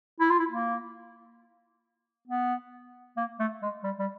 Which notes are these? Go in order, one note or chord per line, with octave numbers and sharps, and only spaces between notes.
E4
F4
E4
A#3
B3
A#3
A3
G#3
G3
G3